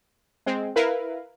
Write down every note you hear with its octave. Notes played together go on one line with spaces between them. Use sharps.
G#3 C4
E4 A#4 B4 F5